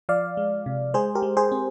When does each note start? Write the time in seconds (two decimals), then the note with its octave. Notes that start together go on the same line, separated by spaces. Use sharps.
0.09 F3 D5 F5
0.37 G#3
0.66 C3
0.94 G#3 G#4 C5
1.15 G4 A#4
1.22 G#3
1.37 G#4 C5
1.52 C4